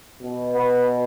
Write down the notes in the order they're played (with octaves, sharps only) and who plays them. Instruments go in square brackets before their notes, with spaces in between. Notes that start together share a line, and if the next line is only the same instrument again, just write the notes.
[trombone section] B2
B3